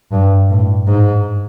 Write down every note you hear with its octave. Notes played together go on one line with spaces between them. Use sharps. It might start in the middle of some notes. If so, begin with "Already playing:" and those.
G2
A2
G#2